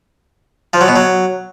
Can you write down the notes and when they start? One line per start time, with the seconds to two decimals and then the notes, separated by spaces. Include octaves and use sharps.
0.73 F3
0.81 F#3
0.88 B2
0.96 F#3